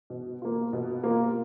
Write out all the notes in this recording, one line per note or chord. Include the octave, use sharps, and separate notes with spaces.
B2
A#3 F4
B2
A#3 F4